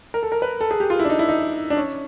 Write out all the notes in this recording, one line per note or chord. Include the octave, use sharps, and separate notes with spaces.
A#4
A4
A#4
B4
A4
G#4
G4
F4
E4
D4
D#4
E4
D#4
D4
C#4